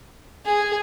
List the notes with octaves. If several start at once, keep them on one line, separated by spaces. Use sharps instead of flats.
G#4